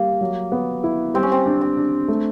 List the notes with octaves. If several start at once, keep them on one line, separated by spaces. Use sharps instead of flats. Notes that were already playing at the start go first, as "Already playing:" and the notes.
Already playing: G3 A#3
F#3
B3
E4
G3 C4
C#4
C4
D4
C4
D4
A3